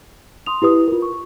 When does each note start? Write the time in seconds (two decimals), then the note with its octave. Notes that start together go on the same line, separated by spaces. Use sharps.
0.46 C6 D#6 F7
0.62 E4 G4 B4 D#6
0.88 F4 A#4
1.02 C#6